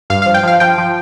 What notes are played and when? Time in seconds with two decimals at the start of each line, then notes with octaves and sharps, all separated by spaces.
0.10 G2 F5
0.22 F5
0.26 F3
0.34 G5
0.43 F3 F5
0.60 F3 G5
0.78 F3